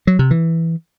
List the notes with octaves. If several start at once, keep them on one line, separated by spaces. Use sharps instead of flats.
F#3
C3
E3